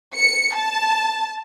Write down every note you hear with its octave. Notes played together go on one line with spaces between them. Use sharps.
C#7
A5